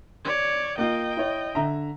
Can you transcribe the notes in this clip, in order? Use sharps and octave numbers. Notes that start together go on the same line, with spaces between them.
C#5 D5
A#3 F4 D#5 G5
E4 C#5
D3 E5 A#5